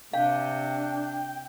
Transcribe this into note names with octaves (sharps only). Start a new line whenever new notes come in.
C3 D4 F5 G5